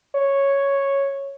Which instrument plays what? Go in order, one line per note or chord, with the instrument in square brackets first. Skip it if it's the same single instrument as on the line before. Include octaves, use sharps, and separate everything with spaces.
[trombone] C#5